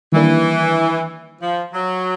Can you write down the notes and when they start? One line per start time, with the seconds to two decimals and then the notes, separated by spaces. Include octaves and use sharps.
0.12 D#3 E3 G3 A#3 D4
1.41 F3
1.73 F#3